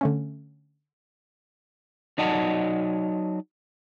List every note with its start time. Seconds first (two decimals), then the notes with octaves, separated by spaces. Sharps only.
0.01 D3 A3 C#4
2.18 F#3 D#4 D5 D#5 F#5 A5